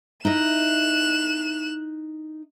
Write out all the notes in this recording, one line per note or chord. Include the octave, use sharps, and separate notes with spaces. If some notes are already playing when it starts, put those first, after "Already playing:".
D#4 E4 D#5 F#6 E7